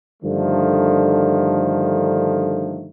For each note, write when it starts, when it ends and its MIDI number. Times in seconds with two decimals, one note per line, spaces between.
0.23 2.90 43
0.23 2.90 50
0.23 2.90 51
0.23 2.90 53
0.23 2.90 57